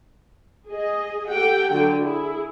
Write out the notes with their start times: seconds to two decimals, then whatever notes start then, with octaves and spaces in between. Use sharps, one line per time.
0.67 G#4 D#5
1.30 G4 A4 F#5 G5
1.71 D3 F#3 G5
2.01 E4 G#4